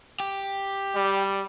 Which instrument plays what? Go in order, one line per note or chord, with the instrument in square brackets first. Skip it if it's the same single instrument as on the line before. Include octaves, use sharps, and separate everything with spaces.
[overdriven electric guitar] G4
[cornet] G3